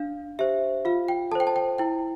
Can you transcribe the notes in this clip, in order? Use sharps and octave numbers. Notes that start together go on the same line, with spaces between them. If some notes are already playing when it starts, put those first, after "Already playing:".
Already playing: D4 F5
G4 C5 E5
F4 F5
G5
A4 C5 G5 A5
A5
G5
E4 G5